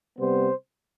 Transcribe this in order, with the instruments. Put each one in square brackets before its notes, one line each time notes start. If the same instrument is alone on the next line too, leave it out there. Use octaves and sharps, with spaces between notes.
[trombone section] C3 G3 B3 C5